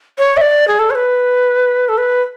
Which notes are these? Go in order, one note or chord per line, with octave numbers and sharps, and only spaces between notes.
C#5
E5
D5
G#4
A4
C#5
B4
A4
B4